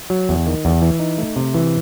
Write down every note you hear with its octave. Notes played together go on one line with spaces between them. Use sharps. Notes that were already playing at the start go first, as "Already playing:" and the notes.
F#3
E2
D#3
E2
E3
D#4
A3
C3
E3